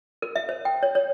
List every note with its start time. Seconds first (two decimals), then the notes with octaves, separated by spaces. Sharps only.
0.22 A#4
0.36 E5
0.49 C5
0.65 G5
0.83 C#5
0.95 C#5